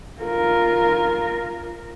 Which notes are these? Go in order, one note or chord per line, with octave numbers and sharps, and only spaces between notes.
F4 A#4